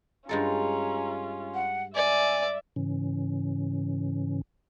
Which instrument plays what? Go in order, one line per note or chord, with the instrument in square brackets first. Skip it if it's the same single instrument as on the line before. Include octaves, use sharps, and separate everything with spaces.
[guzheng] G2 G#3 A4 [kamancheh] C#4 F4 [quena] A#5
[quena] F#5
[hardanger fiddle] D5 [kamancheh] E5 [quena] G#5
[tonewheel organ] G#2 C#3 E3 C#4